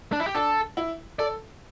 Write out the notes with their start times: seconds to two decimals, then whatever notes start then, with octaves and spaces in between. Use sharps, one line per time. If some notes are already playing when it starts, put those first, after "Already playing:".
0.12 D4
0.20 E4
0.27 G4
0.35 D4 A4
0.77 E4
1.19 A4 D5